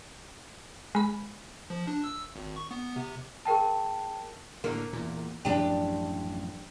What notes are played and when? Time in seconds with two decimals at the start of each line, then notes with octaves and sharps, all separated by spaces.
0.95 G#3 B5
1.70 F3
1.87 D4
2.04 E6
2.36 G#1
2.56 C#6
2.71 B3
2.96 C3
3.45 G#4 A#4 G5 A5
4.64 A2 D3 A#3
4.93 E2 A#2
5.45 A1 F#2 F3 D4 G4